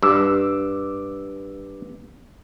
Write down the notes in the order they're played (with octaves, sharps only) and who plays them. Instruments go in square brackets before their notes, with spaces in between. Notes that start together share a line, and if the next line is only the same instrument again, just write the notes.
[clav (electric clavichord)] G2 [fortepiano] D6 E6